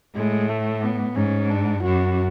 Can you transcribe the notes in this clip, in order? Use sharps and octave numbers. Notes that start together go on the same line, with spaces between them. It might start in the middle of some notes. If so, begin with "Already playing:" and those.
A2 G#3
A3
B3
G#2 C#4
D4
F#2 F#4